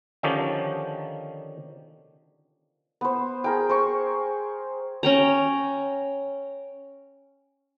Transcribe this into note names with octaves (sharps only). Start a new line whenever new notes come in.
D3 D#3 F3 C#4 D#4 G4
B3 C5
G#4 A#4 G5
C5 C#6
C#4 G5 A#5